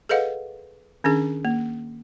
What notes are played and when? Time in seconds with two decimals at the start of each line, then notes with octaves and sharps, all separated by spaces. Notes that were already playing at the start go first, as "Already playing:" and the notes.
0.09 G#4 A4 B4 D#5 F5 F#5
1.04 D#3 C#4 D4 G#4
1.45 A#3